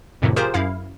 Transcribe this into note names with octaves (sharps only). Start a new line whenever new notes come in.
F2 A2 C3 D#3 F3
F4 G4 G#4 A#4 C5
F#2 E4 F5